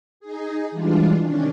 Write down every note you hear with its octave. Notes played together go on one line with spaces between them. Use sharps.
D#4 G#4
E3 G3 G#3 D4 F4
C3 D#3 C#4 D4